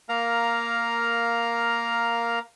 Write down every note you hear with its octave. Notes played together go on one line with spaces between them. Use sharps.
A#3 A#4 F5 A#5